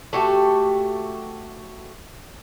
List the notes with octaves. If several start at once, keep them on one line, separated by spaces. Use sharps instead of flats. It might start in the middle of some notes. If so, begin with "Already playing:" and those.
A3 F#4 G4